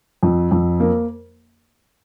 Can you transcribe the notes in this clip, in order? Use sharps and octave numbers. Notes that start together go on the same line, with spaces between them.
F2
F2
A#3